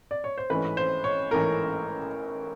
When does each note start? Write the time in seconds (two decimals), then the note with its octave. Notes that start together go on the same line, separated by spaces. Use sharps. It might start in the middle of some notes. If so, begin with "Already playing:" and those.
0.11 D5
0.24 C#5
0.38 C5
0.50 A1 G#2 E3 A3 C#4 B4
0.77 C5
1.04 C#5
1.31 A1 G#2 E3 A3 C#4 A#4